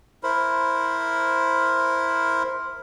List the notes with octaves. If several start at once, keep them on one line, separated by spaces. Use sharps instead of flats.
E4 A#4 C5 B5